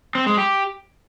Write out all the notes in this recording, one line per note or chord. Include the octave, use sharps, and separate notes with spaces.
C4
G#3
G4